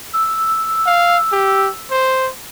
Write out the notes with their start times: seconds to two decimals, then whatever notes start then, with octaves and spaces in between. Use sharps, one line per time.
0.13 E6
0.86 F5
1.32 G4
1.91 C5